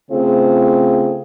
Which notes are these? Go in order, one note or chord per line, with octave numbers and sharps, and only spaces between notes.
C#3 A3 C4 F4 G#4